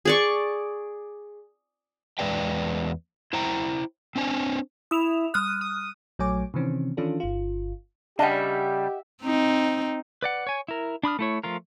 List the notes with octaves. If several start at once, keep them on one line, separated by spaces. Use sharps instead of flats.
G#4 D5 C#6
E2 G#3 B4 D5 G5
E4 C5 G5 A#5
C4 D4 C5 G#5
E4 D#6 E7 F7
G3 D#6 F6 F#6
D#6
A#1 F#3 A3 C#5 G#5 D6
C3 D#3 E3 C4 C#4
D#3 E3 C#4 D4 F4 A4
G1 F4
C#3 G3 D4 G4 D#5 E5 F#5
C4 D#4
B4 D5 F#5
C#5 G#5
E4 A#4
D4 B5 D#6 F6
A3 E4 C#5
F3 A3 F4 A#4